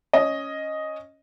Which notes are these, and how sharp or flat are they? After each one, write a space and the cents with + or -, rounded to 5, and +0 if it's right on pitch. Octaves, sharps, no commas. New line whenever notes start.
C#4 +0 D#5 +0